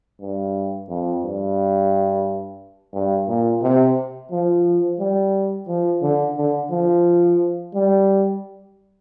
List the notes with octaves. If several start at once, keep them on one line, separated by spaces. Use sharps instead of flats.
G2
F2
G2
G2
A#2
C3
F3
G3
F3
D3
D3
F3
G3